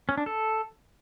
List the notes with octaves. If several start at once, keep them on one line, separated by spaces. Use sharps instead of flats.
C#4
D4
A4